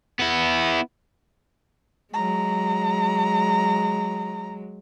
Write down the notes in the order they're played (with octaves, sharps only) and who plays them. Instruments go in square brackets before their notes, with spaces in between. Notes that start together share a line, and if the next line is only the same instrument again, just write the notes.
[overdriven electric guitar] B3 E4
[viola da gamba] F#3 G#3 [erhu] A#5